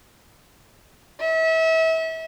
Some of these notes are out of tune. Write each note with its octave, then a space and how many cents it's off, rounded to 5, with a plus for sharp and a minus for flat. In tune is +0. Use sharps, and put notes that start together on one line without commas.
E5 -35